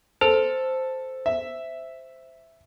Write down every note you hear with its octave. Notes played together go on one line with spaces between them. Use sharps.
A4 C5
E5